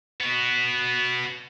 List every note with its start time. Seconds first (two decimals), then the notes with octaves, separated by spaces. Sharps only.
0.21 B3 F#4